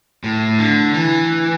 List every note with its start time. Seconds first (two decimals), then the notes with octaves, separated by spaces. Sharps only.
0.24 A2
0.59 D3
0.94 E3